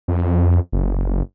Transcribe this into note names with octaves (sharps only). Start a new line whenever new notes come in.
F2
F#1